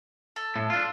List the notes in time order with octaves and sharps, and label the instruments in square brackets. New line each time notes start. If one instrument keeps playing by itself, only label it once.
[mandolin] A4
[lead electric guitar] A2
D4 F4